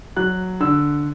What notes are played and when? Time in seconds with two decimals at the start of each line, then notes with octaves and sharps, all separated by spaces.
0.16 F#3 F#6
0.60 D3 E6